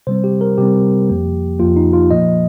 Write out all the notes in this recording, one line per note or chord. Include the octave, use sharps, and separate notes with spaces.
C3 G3 C4 C5
G4
A#4
C3 G3 C4 G4
F2 F3 A#3
F2 F3 A#3 F4
D#4
F4
A#2 F3 A#3 D#5